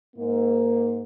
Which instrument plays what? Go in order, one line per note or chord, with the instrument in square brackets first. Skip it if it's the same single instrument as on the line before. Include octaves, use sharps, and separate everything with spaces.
[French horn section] G#2 A#3